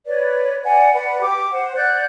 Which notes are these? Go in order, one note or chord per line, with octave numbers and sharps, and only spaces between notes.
B4 C#5 D5
D5 F#5 G#5
B4 D5 F#5
G4 D6
C5 F#5
D5 F#5 F#6 G6